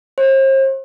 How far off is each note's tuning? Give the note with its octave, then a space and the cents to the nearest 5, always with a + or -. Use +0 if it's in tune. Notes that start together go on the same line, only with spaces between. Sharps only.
C5 +40